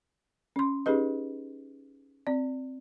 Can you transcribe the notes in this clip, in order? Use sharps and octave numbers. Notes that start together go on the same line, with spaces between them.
C#4 C6
C#4 D#4 G4 G#4 B4 D#5
C4 D5